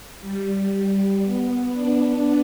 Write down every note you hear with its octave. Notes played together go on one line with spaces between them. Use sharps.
G3
B3
D4